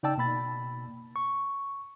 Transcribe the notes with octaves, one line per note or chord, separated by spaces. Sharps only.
C#3 D#4 D5 G5 A5 E6
B2 A#3 B5 A6
C#6